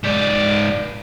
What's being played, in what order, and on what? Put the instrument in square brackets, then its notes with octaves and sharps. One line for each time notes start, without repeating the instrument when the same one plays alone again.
[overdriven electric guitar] G#2 D5